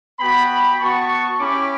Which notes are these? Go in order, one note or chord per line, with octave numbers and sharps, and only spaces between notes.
B3 F#4 G5 B5
B3 F#4 A5 C#6
C#4 E4 G4 B5 D6